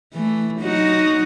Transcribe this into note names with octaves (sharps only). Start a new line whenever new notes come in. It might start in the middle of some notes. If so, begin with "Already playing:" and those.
E3 A3
F#3 D#4 F#4